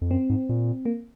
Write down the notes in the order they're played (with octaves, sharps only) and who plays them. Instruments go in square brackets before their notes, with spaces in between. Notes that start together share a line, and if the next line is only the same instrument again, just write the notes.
[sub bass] F2
[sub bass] F#2 [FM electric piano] C4
[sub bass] G#2
A#2
[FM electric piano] A#3